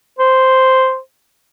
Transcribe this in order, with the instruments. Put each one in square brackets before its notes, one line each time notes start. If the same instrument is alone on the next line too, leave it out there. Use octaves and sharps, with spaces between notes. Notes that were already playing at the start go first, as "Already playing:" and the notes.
[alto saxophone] C5